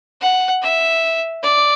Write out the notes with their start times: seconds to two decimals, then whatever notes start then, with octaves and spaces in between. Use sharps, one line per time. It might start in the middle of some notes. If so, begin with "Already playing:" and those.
0.21 F#5
0.62 E5
1.43 D5